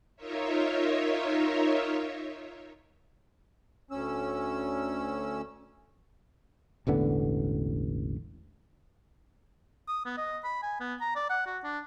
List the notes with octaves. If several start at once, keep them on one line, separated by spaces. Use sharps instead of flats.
D#4 F4 A#4 C#5 E5
D2 C#4 E6
E1 A1 D3 B3
D#6
B3
D#5
B5
G#5
B3
A#5
D5
F#5
F#4
D4